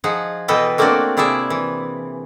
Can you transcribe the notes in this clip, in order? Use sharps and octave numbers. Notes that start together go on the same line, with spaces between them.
F3 D#4 G#4 F#5
B2 E3 A4 B4 D#5 G5
A3 A#3 C4 D4 F#4 D5
C3 E4 G#4 D5 E5
E3